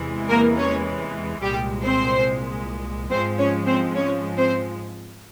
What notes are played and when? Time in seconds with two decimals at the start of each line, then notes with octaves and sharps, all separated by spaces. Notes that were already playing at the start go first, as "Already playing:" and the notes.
Already playing: E2 C3 E3 G#3
0.29 A#3 A#4
0.57 C#4 C#5
1.42 C2 A#2 G3 G#3 G4
1.84 C4 C5
3.10 G#2 F3 G#3 C4 C5
3.38 C#4 C#5
3.66 C4 C5
3.95 C#4 C#5
4.37 C4 C5